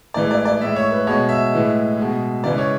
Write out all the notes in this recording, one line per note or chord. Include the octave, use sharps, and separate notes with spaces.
A2 E3 G#3 D5
D5
D5
A2 G#3 E5
C#5
B4
B2 G#3 C#5
E5
A2 E3 G#3
B2 G#3
C#3 E3 G#3 D5
C#5